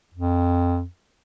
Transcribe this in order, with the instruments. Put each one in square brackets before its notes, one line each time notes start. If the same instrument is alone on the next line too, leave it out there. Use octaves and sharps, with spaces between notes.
[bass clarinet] F2